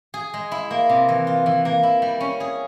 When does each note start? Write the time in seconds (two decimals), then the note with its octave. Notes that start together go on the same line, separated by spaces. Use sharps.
0.14 G#4
0.34 G#3
0.52 E4
0.71 A#3
0.89 C3
1.09 E3
1.27 F4
1.46 E3
1.65 A#3
1.83 E4
2.02 G3
2.20 C#4
2.40 G#4